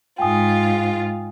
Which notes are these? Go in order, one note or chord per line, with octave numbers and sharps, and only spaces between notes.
G#2 F4 G5 G#5 D#6